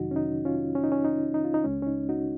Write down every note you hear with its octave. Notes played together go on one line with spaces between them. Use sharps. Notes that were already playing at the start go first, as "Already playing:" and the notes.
Already playing: F2 C3 D#3 F#3 D#4 F#4
C#4
D#4
C#4 F4
C#4
D#4
C#4
D#4
D#4
F4
D#4
C#2 C#3 G#3 C#4
C#4
D#4
D#4 F#4